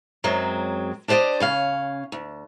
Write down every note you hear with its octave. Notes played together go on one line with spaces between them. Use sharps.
F#2 F#3 G#3 C4
D4 G4 C5 D5 D#5
C#3 C#4 F5
D2